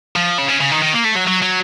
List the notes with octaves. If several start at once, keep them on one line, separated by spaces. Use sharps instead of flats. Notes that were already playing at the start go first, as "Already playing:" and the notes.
F3
C#3
C#3
C#3
D#3
D#3
A#3
A3
F#3
F#3
F#3